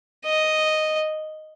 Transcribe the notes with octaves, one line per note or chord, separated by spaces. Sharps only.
D#5